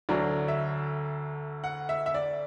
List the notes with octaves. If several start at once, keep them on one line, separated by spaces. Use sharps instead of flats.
D2 D3 F#3 D5
E5
F#5
E5
E5
D5